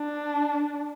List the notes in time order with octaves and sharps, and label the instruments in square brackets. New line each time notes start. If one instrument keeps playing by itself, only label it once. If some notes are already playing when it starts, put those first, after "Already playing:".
Already playing: [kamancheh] D4